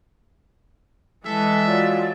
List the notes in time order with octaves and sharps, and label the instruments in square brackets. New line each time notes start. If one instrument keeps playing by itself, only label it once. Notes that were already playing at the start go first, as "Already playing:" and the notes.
[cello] E3 G#3 [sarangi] A4 [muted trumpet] E5
[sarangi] F#3 [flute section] F4 D5